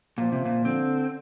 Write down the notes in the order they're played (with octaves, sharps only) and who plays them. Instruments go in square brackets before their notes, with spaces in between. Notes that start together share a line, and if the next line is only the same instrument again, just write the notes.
[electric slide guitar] A#2 [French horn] F3
[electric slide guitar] C3
A#2
[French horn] D3 [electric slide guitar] C4